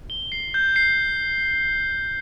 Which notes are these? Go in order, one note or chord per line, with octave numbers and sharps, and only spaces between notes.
G7
C7
G6
C7